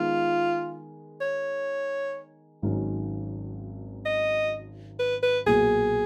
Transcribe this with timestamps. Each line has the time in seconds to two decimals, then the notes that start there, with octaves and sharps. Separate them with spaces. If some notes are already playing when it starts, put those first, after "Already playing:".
Already playing: D#3 G#3 B3 D#4 F4
1.21 C#5
2.62 G#1 G#2 D#3 F#3 C#4
4.05 D#5
4.99 B4
5.22 B4
5.46 B1 A#2 F#3 A#3 G#4